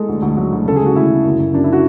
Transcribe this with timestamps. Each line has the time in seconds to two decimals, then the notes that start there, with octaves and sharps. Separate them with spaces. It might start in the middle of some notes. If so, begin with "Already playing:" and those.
Already playing: G#3 A4
0.09 D2
0.22 D2
0.37 F#3 F#4
0.52 D2
0.66 C#3 A4
0.76 G#4
0.81 G#3 F#4
0.95 D2 E4
1.11 C#3
1.24 F#2
1.39 F#2
1.53 F#2 D4
1.64 E4
1.73 F#4